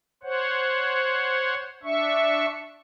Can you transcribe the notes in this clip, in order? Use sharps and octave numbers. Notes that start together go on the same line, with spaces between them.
C5 C#5 F#5
D4 E5 C#6